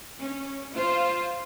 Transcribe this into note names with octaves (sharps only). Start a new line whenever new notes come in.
C#4
F4 C5